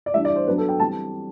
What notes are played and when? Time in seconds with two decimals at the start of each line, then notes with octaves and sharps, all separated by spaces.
0.06 D5
0.14 E3 G3 D4 E5
0.25 D5
0.36 C5
0.47 F#3 B3 D4 B4
0.58 A4
0.69 G5
0.80 E3 G3 C4 A5